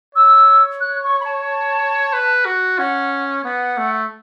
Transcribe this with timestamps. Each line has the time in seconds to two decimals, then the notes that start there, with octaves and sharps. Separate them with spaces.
0.15 C#5 E6
0.81 F#6
1.03 C#6
1.20 B5
1.25 A5
2.13 B4
2.45 F#4
2.78 C#4 F#5
3.44 B3 F#5
3.77 A3